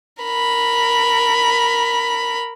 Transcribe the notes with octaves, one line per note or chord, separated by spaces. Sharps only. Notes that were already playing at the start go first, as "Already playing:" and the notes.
A#4 B5